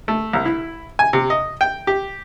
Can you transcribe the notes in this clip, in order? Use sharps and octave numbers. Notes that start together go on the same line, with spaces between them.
A3
C2
E4
G#5
C3
D#5
G5
G4